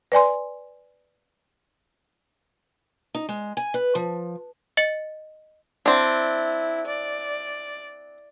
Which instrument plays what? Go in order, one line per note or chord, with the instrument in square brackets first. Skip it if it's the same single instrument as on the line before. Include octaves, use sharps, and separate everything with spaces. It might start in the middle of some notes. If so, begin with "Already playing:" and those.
[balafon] B4 D5 G#5 C6
[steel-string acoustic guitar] D#4
G#3
G#5
B4
F3
[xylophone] D#5 A6 C#7 F#7
[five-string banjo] C4 D4 [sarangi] E4
[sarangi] D5